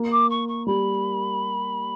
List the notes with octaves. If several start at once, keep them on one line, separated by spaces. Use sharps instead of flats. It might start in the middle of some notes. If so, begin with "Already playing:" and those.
Already playing: A#3
D6
C#6
C#6
G3 B5